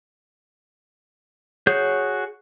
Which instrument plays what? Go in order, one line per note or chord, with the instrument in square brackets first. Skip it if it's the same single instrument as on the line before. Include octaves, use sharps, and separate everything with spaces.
[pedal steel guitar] F#4 G#4 C#5 G6